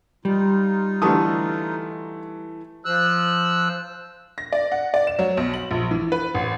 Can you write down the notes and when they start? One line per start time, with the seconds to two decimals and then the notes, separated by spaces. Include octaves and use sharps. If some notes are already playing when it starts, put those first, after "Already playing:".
0.25 G3 D#4 F4
1.02 D3 E3 A3 D#6
2.85 F3 E6 F#6
4.38 A#6
4.53 D5
4.72 F#5
4.94 D5
5.07 E7
5.19 F#3
5.37 B1
5.54 F#7
5.71 A#1
5.91 E3
6.12 B4
6.34 A1